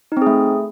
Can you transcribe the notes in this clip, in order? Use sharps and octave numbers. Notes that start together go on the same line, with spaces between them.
A3 C4 D#4 G#4